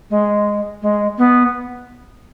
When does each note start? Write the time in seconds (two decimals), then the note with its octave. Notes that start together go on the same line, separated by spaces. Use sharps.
0.10 G#3
0.82 G#3
1.18 B3